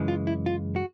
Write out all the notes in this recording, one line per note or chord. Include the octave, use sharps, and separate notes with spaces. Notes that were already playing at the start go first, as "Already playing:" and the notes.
Already playing: F#2 C#3 E3 G#3
F4
E4
F4
F#4